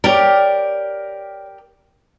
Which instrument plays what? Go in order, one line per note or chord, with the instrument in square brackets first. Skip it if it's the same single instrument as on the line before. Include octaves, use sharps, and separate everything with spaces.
[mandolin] G4 A#4 [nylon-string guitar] C#5 D5